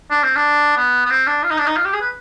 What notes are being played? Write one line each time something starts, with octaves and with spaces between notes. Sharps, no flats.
D4
C4
D4
B3
B3
C4
D4
F4
D#4
D4
D#4
F4
G4
G#4
B4